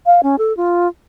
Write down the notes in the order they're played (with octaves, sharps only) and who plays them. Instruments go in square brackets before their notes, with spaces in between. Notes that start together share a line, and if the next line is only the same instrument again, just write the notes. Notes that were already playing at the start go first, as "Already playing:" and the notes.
[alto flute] F5
C#4
A4
F4